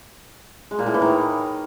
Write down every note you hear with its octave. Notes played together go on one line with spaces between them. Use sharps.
G#3
A#2
A2
E3
D#3